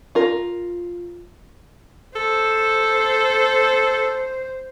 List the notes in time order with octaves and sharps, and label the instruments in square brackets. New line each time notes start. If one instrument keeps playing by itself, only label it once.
[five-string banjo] F4 A#4
[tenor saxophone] A4 [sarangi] C5